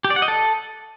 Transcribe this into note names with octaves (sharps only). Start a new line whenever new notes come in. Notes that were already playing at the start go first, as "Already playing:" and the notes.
G4
D5
F#5
D#5
A4